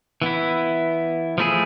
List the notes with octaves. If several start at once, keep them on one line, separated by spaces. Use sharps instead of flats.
E3 B3 E4
F3 A3 E4 G#4